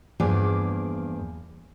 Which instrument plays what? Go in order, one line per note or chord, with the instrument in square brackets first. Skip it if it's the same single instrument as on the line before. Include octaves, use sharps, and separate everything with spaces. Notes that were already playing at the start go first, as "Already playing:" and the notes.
[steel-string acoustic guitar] E2 G2 F3 A#3 G#4 D5